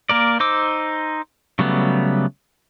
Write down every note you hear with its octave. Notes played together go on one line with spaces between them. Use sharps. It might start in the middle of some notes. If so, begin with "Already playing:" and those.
A#3 A#4 D5
D#4 C5 D6 E6
C#3 F#3 G3 A3 B3